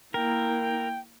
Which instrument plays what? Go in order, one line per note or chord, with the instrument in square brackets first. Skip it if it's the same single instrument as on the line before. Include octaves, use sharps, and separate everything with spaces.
[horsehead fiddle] A#3 E4 [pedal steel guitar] A#4 [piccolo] G5